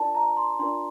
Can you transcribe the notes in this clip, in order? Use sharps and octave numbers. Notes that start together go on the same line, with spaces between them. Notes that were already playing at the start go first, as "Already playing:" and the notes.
Already playing: D4 F4 A#4 D5 A5
A#5
C6
D4 F4 A#4 D5 C6